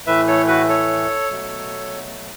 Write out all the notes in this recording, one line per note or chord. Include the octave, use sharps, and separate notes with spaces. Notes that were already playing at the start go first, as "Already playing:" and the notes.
A2 E3 A3 B4 E5
A4 C#5
F#4 B4
A4 C#5
B2 F#3 A3